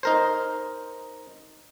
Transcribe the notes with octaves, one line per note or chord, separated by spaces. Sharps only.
D#4 A#4 C5